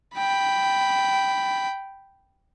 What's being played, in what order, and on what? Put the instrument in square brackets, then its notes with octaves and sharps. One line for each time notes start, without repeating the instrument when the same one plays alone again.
[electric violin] G5 B5